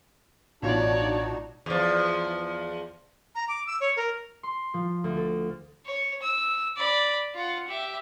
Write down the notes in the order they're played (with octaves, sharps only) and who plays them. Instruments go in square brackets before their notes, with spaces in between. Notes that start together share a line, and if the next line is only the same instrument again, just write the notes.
[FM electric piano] A1 B2 F4 [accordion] D4 D#4 F#4 [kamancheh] C#5 D5
[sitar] E2 F3
[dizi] A#5
D6
E6
C#5
A#4
[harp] C6
F3
D2
A4
[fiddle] C#5
E6
D5 B5
F4 F#5
G4 E5